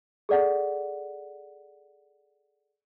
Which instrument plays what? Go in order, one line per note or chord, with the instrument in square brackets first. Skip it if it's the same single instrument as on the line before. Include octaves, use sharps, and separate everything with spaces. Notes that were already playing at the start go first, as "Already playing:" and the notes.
[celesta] G#4 A4 D5 F#5